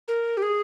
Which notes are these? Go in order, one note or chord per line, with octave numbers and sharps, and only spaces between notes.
A#4
G4
G#4